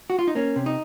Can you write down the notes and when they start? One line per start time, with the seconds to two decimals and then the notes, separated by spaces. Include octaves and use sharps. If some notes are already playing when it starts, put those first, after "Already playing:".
0.10 F#4
0.19 F4
0.27 D#4
0.35 A#3 C#4
0.56 C3
0.66 D#4